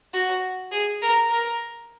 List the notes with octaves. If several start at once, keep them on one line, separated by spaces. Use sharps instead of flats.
F#4
G#4
A#4
A#4